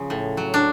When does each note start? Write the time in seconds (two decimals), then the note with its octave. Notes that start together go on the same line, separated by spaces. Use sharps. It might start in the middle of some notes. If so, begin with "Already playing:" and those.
Already playing: C#3 F3
0.10 A2
0.37 F#3
0.54 D4